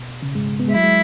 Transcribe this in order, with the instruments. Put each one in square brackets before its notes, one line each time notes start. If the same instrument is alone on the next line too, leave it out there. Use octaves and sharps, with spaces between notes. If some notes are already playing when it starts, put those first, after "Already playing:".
Already playing: [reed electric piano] B2
C#3
G#2 G#3
B3
G#3
[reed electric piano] F#3 [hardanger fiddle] E4
[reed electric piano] G#3